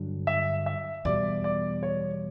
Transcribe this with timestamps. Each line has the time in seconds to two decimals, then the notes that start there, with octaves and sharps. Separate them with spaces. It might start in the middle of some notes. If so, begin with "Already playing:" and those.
Already playing: G2 D3 F#3
0.27 E5
0.66 E5
1.05 E2 B2 G3 D5
1.44 D5
1.83 C#5